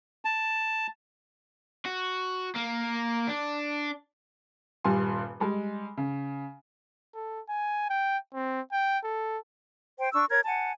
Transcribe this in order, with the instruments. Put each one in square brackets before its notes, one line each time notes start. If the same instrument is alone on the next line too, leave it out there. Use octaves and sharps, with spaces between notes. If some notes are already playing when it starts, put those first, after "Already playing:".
[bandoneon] A5
[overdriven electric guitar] F#4
A#3
D4
[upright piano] D#1 G2 G3 G#5 C6
G3 G#3
C#3
[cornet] A4
G#5
G5
C4
G5
A4
[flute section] C5 G5
D4 C#6 E6
A#4 C#5 G#6
F#5 G#5 A5